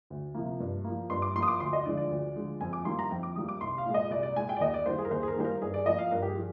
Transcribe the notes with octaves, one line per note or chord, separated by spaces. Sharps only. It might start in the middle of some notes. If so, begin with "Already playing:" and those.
D2
C3 F3 A#3
G2
F3 A#3
G2 C6
D6
F3 A#3 C6
D#6
D6
D2 C6
D#5
D3 F3 G#3 D5
D5
D2
D3 F3 G#3
F2 G#5
D6
D#3 G3 A#3 C6
A#5
F2 G5
D6
D#3 G3 A#3 D#6
D6
C2 C6
F5
A#2 G#3
D#5
C2 D5
D5
A#2 G#3 G#5
G5
D5
D#2 D#5
D5
D#3 G3 A#3 C5
G#4
A#4
D#2 C5
G#4
A#4
D#3 G3 A#3 C5
A#4
G2 G#4
D5
F3 A#3 D#5
F5
G2 A#4
G4
G#4
F3